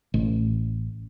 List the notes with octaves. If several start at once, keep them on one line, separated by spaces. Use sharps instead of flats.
A1